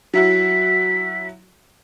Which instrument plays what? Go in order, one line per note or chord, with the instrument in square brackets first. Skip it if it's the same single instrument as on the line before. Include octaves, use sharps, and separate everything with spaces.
[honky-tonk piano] F#3 E4 F#4 [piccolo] B6